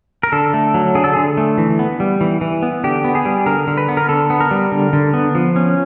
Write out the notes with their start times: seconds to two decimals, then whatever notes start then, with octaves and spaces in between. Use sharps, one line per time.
0.23 A#4
0.32 D3 A4
0.54 A3
0.74 F#3
0.95 D3 G#4
1.04 A4
1.13 D3 G#4
1.37 A3
1.58 E3
1.79 B3
2.00 G3
2.21 E3
2.41 E3
2.63 B3
2.84 D3 G4
3.04 B3
3.15 G#4
3.26 G3
3.46 D3 A#4
3.67 D3
3.78 B4
3.89 B3
3.97 A#4
4.09 D3 A4
4.30 B3
4.40 A#4
4.51 G3
4.72 D3
4.93 D3
5.14 B3
5.35 F3
5.56 C#4